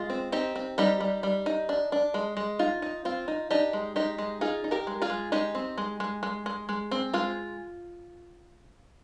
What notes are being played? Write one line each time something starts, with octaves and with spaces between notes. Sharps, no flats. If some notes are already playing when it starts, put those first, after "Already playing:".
Already playing: G#3 F4
C4
C4 D#4 G4
C4
G3 D#4 G4
G3
G3
D#4
D4
D4
G#3
G#3
D#4 F4
D#4
C4 F4
D#4
D4 D#4 G4
G#3
G#3 D#4 G4
G#3
D#4 F4 G#4
D#4
G4 A#4
G#3
F4 G#4
G#3
G#3 D#4 G4
C4
G#3
G#3
G#3
G#3
G#3
C4
G#3 F4